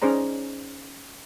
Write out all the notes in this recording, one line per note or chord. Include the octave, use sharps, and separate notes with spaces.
C#4 D#4 G#4 C5 D5 A#5